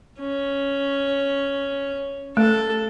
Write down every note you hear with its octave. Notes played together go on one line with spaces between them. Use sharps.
C#4
A3 A4